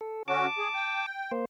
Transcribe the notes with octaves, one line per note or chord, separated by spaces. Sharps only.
A4
D3 C#4 F#4 A5 D6
G#4
G5
A#3 C5